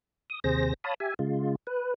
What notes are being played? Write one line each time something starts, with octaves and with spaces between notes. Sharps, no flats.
D#6
D#2 C3 G#4 C5 A#6
C#5 F5 A5 B5 D#6
G4 E5 G#5
C#3 G#3 F4
B4